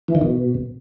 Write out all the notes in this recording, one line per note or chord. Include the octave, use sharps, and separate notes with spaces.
E3
D#3
B2